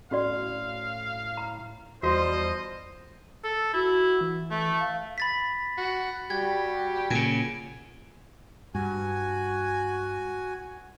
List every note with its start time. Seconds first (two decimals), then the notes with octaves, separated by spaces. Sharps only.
0.11 A2 C#4 F#4 D5 F5
1.37 A#5
2.03 E2 F3 G3 F#4 C5 D#5
3.44 A4
3.74 E4 F#4
4.21 E3
4.51 A3
4.80 F5
5.18 B5 A6 B6
5.78 F#4
6.30 G3 F#4 G4 G#6
7.10 A#2 C#3 G#5 D7
8.75 G2 F#4 G#5